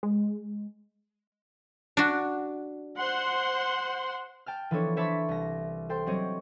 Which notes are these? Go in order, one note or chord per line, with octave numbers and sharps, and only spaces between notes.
G#3
D4 F#4
C5 F#5 C6
G5 A5 F6
E3 F3 B3 D4 A4 C#5
C5 C#5 E5 A5 B5 D6
C2 A#6
A4 C5 G5 C6
F#3 G3 C4 G4 C#5 D#5